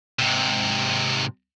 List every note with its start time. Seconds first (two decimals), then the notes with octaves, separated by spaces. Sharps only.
0.19 G#2 C3